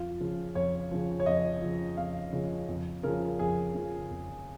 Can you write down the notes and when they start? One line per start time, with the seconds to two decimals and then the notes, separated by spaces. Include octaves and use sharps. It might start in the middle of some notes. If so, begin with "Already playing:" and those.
Already playing: F2 F4
0.20 C#3 F3
0.55 F2 C#5
0.91 C#3 F3
1.20 C#5
1.26 F2 D#5
1.62 C#3 F3
1.97 F2 F5
2.33 C#3 F3
2.68 F2
3.03 C#3 F3 A#4
3.39 F2 G#4
3.75 C#3 F3
4.10 F2